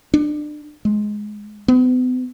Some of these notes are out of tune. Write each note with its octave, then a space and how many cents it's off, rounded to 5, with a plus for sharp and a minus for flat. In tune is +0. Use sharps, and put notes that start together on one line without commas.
D4 +30
G#3 +10
B3 +40